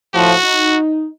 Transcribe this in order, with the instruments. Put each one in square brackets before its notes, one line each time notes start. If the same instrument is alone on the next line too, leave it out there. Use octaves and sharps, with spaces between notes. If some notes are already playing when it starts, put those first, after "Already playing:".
[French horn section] A2 F3 [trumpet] F#4
[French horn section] D#4